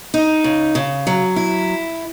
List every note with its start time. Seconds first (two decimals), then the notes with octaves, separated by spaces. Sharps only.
0.14 D#4
0.44 C#3
0.75 C#3
1.07 F#3
1.36 E4